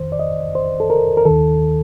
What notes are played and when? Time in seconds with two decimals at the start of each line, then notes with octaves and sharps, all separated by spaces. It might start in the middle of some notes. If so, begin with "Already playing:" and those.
Already playing: F2 D#3 C5
0.12 D5
0.19 D#5
0.55 C5
0.80 A4
0.90 A#4
1.17 A#4
1.25 D#2 D#3 A4